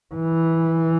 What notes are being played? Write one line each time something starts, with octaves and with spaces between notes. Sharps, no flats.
E3